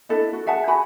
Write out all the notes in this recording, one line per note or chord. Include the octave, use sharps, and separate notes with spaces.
D4 E4 A4 D#5
F#4
G#4 E5 F#5 A5
F#4 G#5 B5